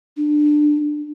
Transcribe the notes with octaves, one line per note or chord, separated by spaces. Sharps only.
D4